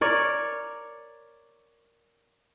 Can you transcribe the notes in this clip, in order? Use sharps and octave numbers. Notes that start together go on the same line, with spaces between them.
A#4 C#5 D5